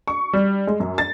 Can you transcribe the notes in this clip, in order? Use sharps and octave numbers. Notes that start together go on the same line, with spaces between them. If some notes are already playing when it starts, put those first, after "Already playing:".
C#6
G3
G#3
F#2
A6